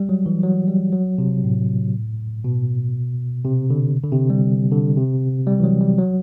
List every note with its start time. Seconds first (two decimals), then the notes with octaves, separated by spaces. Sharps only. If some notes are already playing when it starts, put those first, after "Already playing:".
Already playing: G3
0.09 F#3
0.26 E3
0.43 F#3
0.68 G3
0.93 F#3
1.18 C3
1.44 A2
2.44 B2
3.45 C3
3.70 D3
4.04 D3
4.12 C3
4.30 G3
4.72 D3
4.97 C3
5.47 G3
5.59 E3
5.64 F#3
5.81 G3
5.98 F#3